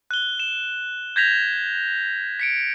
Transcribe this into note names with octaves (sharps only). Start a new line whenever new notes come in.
F#6 G7
E7
G6 G#6 A#6 B6 F7
B6 C#7 D7